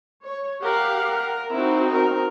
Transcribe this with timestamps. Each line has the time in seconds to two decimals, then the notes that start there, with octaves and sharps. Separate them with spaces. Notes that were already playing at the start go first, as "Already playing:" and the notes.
0.24 C#5
0.63 G4 A#4 F5 F#5
1.53 C4 D#4 E4 F#4
1.91 A#4